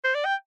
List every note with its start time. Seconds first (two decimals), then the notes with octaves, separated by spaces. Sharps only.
0.04 C5
0.15 D5
0.25 G5